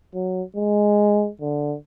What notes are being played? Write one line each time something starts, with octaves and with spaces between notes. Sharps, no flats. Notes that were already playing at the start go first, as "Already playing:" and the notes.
F#3
G#3
D3